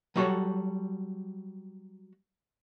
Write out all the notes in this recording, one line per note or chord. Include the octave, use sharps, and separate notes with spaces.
F#3 G3 F#4 G#4 A4 C#5